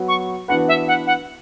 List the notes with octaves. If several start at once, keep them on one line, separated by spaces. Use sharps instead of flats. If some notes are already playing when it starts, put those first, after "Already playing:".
Already playing: F#3 B3 F#4 B4
C#6
E3 B3 D4 F#4 B4 F#5
E5
F#5
F#5